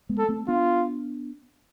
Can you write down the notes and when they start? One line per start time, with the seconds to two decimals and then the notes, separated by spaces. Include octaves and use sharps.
0.09 G#3 B3
0.18 A4
0.29 A3 C4
0.48 B3 D4 F4